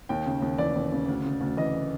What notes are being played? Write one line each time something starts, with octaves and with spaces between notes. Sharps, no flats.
D#2 G5
C#3
D#2
E3 D5
D#2
C#3
D2
C#3
D2
E3 D#5